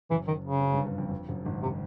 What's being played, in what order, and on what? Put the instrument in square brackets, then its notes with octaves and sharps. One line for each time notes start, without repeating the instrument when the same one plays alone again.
[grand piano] F#1 F#2 [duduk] E3
[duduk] D#3
C#3
[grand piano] F#1 F#2
G1 G2
G1 G2
F2
F2
F#1 F#2
G#1 G#2
[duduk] C3